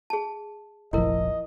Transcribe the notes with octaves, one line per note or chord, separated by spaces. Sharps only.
G#4 A5
F1 A#1 F3 E4 A#4 D#5